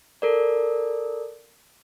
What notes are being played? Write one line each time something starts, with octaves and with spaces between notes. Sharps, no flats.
A4 A#4 D5